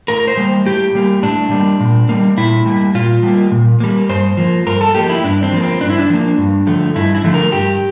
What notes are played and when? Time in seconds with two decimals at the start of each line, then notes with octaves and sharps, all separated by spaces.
0.08 A2 A#4
0.27 C5
0.37 G3 A#3
0.66 A2 G4
0.95 G3 A#3
1.23 A2 D4
1.51 G3 A#3
1.80 A#2
2.09 G3 A#3
2.37 A#2 E4
2.66 G3 A#3
2.94 A#2 F4
3.23 G3 A#3
3.51 A#2
3.80 G3 A#3
4.09 G2 C5
4.37 F3 A#3
4.66 G2 A#4
4.81 A4
4.95 F3 A#3 G4
5.09 E4
5.24 G2 D4
5.43 C4
5.52 F3 A#3
5.62 C4
5.81 G2 D4
5.90 E4
5.99 D4
6.09 F3 A#3
6.38 G2
6.67 D3 F3 A3
6.95 G2 E4
7.15 E4
7.24 D3 F3 A3
7.34 A#4
7.52 G2 G4